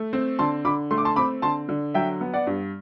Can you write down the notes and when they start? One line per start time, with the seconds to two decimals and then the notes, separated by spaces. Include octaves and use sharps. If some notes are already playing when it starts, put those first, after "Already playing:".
Already playing: A3
0.13 C4
0.39 D3 A5 C6
0.65 D3 B5 D6
0.91 A3 C6
0.98 D6
1.05 A5 C6
1.16 C4 B5 D6
1.42 D3 A5 C6
1.69 D3
1.94 F#3 E5 G5
2.21 B3
2.33 D5 F#5
2.47 G2